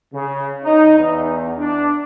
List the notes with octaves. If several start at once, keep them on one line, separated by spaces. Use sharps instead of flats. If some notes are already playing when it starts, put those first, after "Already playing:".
C#3
D#4
E2
D4